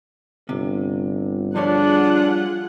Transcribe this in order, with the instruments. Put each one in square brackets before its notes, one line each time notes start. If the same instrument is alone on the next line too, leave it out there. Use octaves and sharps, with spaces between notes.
[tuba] G1 [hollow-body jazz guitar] C3
[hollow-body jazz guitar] F3 G3 C#5 [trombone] D4 [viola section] F4 G#4 F#5